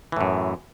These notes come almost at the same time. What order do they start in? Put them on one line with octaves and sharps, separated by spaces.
E3 A2 F#2